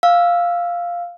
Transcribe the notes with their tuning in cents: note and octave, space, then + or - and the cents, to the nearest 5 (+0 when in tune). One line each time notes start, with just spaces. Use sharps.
F5 +0 E6 +0